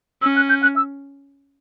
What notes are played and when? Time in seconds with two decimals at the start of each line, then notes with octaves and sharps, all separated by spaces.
0.22 C#4 E6
0.36 F#6
0.49 G6
0.63 F#6
0.76 E6